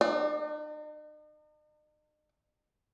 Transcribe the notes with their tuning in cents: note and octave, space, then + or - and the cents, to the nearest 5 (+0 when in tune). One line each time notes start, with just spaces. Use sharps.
D#4 -45 D5 +25